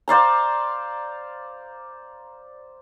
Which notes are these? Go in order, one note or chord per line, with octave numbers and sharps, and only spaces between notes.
C5 D5 F5 A#5